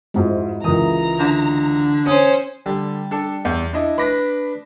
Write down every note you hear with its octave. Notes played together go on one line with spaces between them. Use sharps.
F2 G#2 G#3 C4 E4 F#4
C#2 E3 E4 A#4 A#5 D#6
D3
C#4 C5 D#6
D3 G3
D4 A4
E2
D4 E4 D#5
D4 B4 B5 D6 A#6